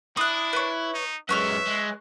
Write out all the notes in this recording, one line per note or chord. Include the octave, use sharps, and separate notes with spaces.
D4 E4 D#6 F#6
B4 C#5
D#4
F#2 G#3 B4 C#5 E5 F6
G#3